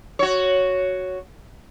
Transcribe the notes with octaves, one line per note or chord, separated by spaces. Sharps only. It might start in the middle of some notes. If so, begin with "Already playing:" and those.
F#4 C#5